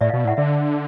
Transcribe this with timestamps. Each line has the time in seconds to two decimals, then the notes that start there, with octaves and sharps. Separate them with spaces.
0.01 A2 D5 E5
0.09 B2 D#5 F5
0.25 A2 E5 F#5
0.37 D3 D5 E5